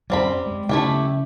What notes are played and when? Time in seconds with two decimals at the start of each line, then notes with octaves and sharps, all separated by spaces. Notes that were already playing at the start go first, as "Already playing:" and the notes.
0.10 F#2 F#3 G3 C4 B5
0.46 G#3
0.69 C#3 F#3 A3 B3 E4 G4